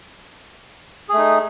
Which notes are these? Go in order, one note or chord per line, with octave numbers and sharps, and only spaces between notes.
A3 D#4 G#4